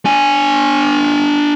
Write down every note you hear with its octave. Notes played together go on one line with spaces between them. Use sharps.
D4 G#5